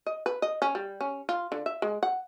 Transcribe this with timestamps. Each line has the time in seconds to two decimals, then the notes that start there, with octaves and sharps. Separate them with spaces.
0.06 D#5
0.26 B4
0.42 D#5
0.62 C#4
0.75 G3
1.01 C#4
1.29 F4
1.52 D3
1.66 E5
1.82 G#3
2.03 F#5